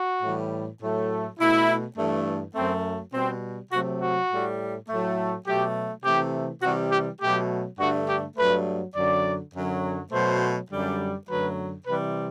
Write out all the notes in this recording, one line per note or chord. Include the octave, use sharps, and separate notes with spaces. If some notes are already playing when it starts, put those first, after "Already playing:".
Already playing: F#4
A2 E3 G3
A2 F#3 A3
B2 A3 E4
G2 E3 A3
F#2 F#3 A3 C4
B2 G3 C4
C3 F#3 A3 F#4
F#4
A2 G3
A2 F#3 A3
B2 F#3 A3 G4
C3 E3 A3 G4
C3 E3 G3 F#4
G4
B2 F#3 A3 G4
G2 D3 A3 F#4
G4
G2 F#3 A3 B4
F#2 D3 F#3 D5
F#2 D3 F#3
B2 F#3 A3 C5
F#2 D3 G3
F#2 D3 F#3 A3 B4
C3 E3 G3 B4